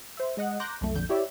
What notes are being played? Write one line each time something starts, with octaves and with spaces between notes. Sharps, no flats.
C5 E5
G#3 D#5 F#5
A#5 C6 D6 F#6 G6 A#6
C2 F#2 A3
A#1 F2 D3 G6
E4 G4 C#5 D5 E5